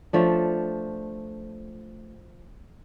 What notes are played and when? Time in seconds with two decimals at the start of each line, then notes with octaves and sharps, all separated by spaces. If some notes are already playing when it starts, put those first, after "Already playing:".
0.13 F3 A3 D4